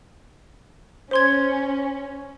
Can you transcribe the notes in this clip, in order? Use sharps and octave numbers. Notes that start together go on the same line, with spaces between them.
C#4 C5 C6 G#6